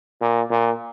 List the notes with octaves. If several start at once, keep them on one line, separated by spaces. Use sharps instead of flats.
A#2
A#2